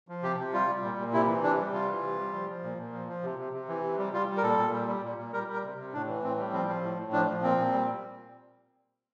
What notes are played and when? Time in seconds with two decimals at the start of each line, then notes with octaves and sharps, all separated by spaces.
0.08 F3
0.23 C3 G4
0.38 C3
0.53 G3 F4
0.68 G3
0.83 A#2
0.98 A#2
1.13 C3 E4
1.28 E3
1.43 C3 D4
1.58 G3
1.73 C3 F4
1.88 E3
2.03 C3
2.18 G3
2.33 F3
2.48 F3
2.63 A#2
2.78 A#2
2.93 F3
3.08 F3
3.23 C3
3.39 C3
3.53 C3
3.68 E3
3.83 C3
3.98 G3
4.13 G3 F4
4.28 G3
4.37 A#4
4.43 A#2 A4
4.58 A#2
4.73 G3
4.88 G3
5.03 A#2
5.18 A#2
5.33 G3 A#4
5.48 G3
5.53 A#4
5.63 C3
5.78 C3
5.93 A2 D4
6.08 E3
6.23 A2 C4
6.38 G3
6.53 F3 C4
6.68 F3
6.83 A2
6.97 A2
7.12 F3 D4
7.28 F3
7.43 A#2 C4
7.57 A#2
7.72 G3